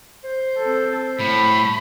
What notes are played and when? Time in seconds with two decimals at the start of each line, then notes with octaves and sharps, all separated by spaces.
0.24 C5
0.58 C4 A4
1.20 A2 B5